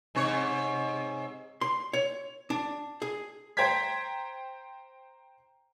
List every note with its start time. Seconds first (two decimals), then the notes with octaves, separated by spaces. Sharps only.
0.15 G#2 C3 C#5
1.61 C6
1.93 C#5
2.50 D4
3.02 G#4
3.57 C5 G5 A#5 G#6 B6